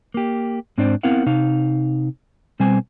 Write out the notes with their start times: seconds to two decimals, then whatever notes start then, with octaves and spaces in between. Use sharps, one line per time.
0.14 A#3 G4
0.78 G#2 C4 D4 C5 D5
1.03 B3 C4 E4 A#4 F5 F#5
1.26 C3 D#4 F5
2.60 B2 G3 C4 C5 G#5